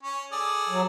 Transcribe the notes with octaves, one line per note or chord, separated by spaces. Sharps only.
C#4 C#5
G#4 A4 D5
F#3